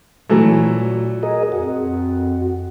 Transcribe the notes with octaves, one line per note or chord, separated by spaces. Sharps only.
A#2 E3 F#3 A3
G#4 A#4 D#5
F2 F#4